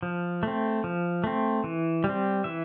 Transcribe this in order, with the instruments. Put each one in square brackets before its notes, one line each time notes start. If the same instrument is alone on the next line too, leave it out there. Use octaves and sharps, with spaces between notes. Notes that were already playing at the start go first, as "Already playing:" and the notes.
[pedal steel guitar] F3
A3 C4
F3
A3 C4
E3
G3
C4
E3 E5